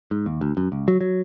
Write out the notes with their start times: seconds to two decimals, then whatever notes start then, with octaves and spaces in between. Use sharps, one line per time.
0.11 G#2
0.26 D#2
0.41 D2
0.57 F#2
0.72 C#2
0.88 F#3
1.01 F#3